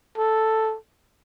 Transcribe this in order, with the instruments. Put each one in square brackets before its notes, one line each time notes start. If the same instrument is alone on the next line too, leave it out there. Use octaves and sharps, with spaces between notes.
[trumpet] A4